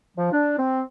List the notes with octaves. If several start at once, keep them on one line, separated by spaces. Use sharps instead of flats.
F3
D4
C4